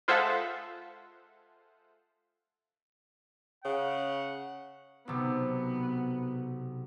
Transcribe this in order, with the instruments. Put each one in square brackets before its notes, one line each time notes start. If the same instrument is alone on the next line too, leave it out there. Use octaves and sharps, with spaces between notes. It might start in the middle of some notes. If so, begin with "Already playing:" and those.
[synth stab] G#3 F4 A4 C5 E5 F#5
[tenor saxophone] C#3 [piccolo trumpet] F#5
[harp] B1 C3 [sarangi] B3